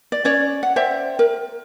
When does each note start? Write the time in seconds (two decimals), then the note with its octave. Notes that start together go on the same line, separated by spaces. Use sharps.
0.12 D5
0.25 C#4 C#5 D5
0.63 F#5
0.76 C5 D5 E5 G5
1.19 A#4